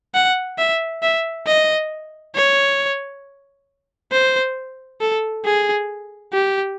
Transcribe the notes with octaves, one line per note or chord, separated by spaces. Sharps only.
F#5
E5
E5
D#5
C#5
C5
A4
G#4
G4